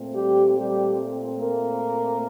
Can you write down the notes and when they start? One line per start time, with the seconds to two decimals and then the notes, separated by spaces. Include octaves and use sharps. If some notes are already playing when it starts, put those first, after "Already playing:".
Already playing: A#2 A3 C4
0.13 G3 G4
0.55 G3 G4
1.39 A#3 A#4